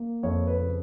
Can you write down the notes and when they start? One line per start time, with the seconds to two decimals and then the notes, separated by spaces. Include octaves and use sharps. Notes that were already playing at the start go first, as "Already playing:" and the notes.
Already playing: A#3
0.23 F2 C#5
0.47 B4
0.60 C#3